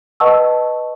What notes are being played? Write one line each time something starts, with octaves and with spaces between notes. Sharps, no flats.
B4 D#5 F#5 A5 C#6 E6